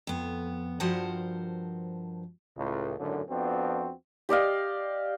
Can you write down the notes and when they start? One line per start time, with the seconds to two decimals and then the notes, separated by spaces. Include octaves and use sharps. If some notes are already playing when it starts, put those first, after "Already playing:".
0.07 F2 B3
0.80 G2 F3 F#4 A#4 C5 F#5
2.57 C#2 A2
2.98 G#1 F#2 A2 D3
3.29 F2 F3 B3 C4 D4 F#4
4.29 G4 D5 D#5 F5